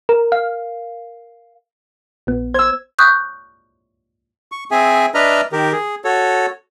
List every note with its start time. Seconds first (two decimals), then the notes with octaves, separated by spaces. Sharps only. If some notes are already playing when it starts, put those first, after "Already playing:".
0.09 A#4
0.32 F5
2.27 A#1 B3
2.54 C5 E6 G#6
2.99 C#6 D#6 F#6 G6
4.52 C#6
4.71 C4 G#4 E5 G#5
5.14 D4 B4 D#5 E5 A#5 F6
5.53 D#3 G4 A#4
5.72 G#4
6.05 F#4 A4 C#5